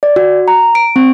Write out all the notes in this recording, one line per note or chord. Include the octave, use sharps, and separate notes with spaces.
D5
F#4
A#5
D7
C4